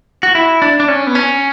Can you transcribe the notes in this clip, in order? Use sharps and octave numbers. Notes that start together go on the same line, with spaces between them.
F#4
E4
D4
D4
C#4
B3
C#4